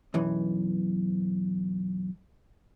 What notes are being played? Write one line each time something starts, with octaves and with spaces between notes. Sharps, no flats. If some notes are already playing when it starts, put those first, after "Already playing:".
B1 F#2 E3